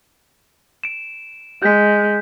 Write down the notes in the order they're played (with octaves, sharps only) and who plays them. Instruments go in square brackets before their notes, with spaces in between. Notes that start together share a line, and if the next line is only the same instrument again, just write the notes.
[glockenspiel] D7 E7
[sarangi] G#3 [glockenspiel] G6 B6